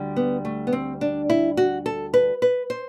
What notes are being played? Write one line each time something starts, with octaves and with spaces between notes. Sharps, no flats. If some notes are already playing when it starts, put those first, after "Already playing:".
Already playing: D2 D3 G3
B3
A3
B3
C4
D4
E4
F#4
A4
B4
B4
C5